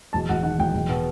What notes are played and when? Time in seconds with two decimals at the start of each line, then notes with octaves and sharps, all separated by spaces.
0.13 E1 A5
0.29 E1 F#5
0.43 D#3 F#5
0.59 E1 G5
0.74 E1
0.89 B2